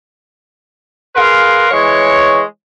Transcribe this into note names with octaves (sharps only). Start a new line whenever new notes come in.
G#4 A#4 B4 F5 C6
E3 G#3 C#5